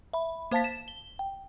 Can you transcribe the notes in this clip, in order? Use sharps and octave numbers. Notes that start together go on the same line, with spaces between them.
E5 B5
A#3 C5 F5 A5 A6 B6
E7
G7
G5